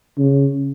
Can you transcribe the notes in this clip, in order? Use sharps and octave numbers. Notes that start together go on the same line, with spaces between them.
C#3